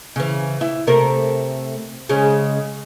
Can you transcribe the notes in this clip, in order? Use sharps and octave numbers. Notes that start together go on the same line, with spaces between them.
C#3 E3
E4
C3 A3 A#4
C#3 G#3 C#4